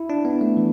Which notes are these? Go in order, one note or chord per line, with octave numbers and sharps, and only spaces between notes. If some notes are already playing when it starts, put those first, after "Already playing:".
Already playing: E4
D4
B3
A3
E3